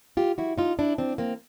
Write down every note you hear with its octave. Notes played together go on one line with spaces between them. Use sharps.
F4 G4
E4 F#4
D#4 F4
D4 E4
C4 D4
A#3 C4